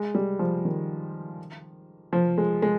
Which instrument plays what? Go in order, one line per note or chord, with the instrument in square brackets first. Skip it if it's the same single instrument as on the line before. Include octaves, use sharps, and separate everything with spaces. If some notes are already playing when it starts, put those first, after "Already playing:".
Already playing: [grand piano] G#3
G3
F3
D#3
F3
G#3
G#3